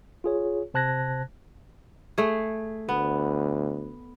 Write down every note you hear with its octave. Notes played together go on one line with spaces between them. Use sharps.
F4 G#4 C#5
C3 C5 A5 F#6 G#6 A#6
A3 G#4
D2 B3